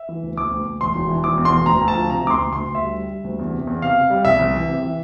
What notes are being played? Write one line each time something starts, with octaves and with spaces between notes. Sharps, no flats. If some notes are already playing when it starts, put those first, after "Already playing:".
Already playing: E5
E3
D2
D2 D6
D2
D2
E1 C6
E1
E3
E1 D6
E2
C6
E1
D2 A#5
D2
A5
F3
C3 A#5
D2 D6
C6
D2
D2 C6
D2
E5
G3
G3
G3
D2
E2
C3
E2
C3 F5
C3
G3
C2 E5
C2
E3
C3
E3